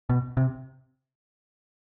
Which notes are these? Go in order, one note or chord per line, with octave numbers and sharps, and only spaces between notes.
B2
C3